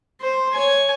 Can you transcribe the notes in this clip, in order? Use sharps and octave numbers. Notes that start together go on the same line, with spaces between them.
C5
C#5 G#5